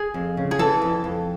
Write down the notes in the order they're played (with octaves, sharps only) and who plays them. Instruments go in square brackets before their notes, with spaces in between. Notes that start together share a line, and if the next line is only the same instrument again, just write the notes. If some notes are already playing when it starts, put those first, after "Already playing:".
Already playing: [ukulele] G#4
[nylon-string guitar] F2
C#3
[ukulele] G#4
[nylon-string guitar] E3 [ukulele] A4
[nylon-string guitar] F2
F2